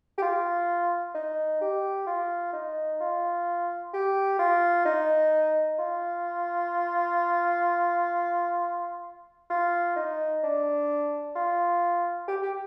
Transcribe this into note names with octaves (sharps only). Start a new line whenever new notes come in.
G4
F4
D#4
G4
F4
D#4
F4
G4
F4
D#4
F4
F4
D#4
D4
F4
G4
G4